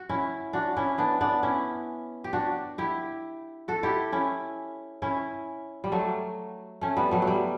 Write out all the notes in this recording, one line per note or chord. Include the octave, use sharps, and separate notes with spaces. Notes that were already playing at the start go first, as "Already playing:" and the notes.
Already playing: F#4
C#4 E4
D4 F#4
C#4 E4
B3 D4
B3 D4
C#4 E4
G4
D4 F#4
E4 G4
F#4 A4
E4 G4
C#4 E4
C#4 E4
G3
F#3 A3
A3 C#4
G3 B3
F#3 A3
F#3
G3